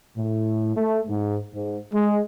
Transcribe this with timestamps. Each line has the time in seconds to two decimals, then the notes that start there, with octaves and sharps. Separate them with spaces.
0.17 A2
0.77 A3
1.07 G#2
1.54 G#2
1.92 G#3